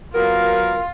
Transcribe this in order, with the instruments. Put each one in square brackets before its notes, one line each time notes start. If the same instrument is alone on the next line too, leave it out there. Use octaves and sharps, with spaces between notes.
[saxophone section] F#3 B3 A#4 [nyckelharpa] F4